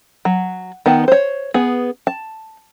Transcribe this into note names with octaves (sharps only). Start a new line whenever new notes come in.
F#3
D#3 B3 A5
C5 C#5
B3 G#4
A5